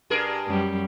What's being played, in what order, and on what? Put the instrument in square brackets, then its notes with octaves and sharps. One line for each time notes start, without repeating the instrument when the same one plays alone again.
[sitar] G2 G#4 A#4
[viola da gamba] F#2 G3